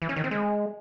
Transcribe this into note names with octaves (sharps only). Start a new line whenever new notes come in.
E3
C#4
D#3
C4
G#3